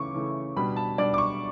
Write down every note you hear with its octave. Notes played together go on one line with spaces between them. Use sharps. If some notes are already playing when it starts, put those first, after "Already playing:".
Already playing: C#3 E3 A3 E4 C#6 D6
C#3 E3 A3 E4
B2 G3 D4 B5
A5
B2 G3 D4 D5
D6
C#6